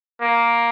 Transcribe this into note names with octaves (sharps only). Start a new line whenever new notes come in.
A#3